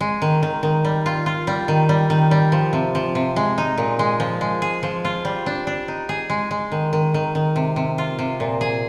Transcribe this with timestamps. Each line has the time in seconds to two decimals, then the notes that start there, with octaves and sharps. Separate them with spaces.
0.01 G#3
0.22 D#3
0.43 D#3
0.63 D#3
0.85 G3
1.06 F4
1.26 F4
1.47 G3
1.68 D#3
1.89 G3
2.10 D#3
2.31 G3
2.52 F3
2.73 C3
2.95 F3
3.15 C3
3.36 G#3
3.58 D#4
3.78 A#2
3.99 G#3
4.20 F3
4.41 G#3
4.62 G#4
4.83 F3
5.05 F4
5.25 G3
5.46 D4
5.67 D4
5.88 D#4
6.09 G#4
6.30 G#3
6.51 G#3
6.72 D#3
6.93 D#3
7.14 D#3
7.35 D#3
7.56 C3
7.76 C3
7.98 F4
8.19 C3
8.40 A#2
8.61 G#4